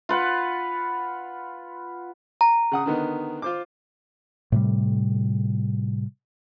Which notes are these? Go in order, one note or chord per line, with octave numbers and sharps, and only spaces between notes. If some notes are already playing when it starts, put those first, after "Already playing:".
F4 B4 F#5
A#5
C#3 F#5 D#6
D3 D#3 B3
F4 C5 D6
A2 C3 G3